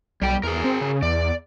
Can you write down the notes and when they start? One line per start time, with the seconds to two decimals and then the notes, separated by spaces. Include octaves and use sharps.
0.22 B1 G3 G5
0.43 E2 G#4 A#4
0.64 C4
0.81 C#3
1.03 E2 D5